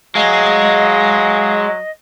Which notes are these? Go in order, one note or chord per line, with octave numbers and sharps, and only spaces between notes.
F#3 G#3 D#5 F5